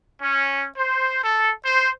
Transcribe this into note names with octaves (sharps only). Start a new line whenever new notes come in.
C#4
C5
A4
C5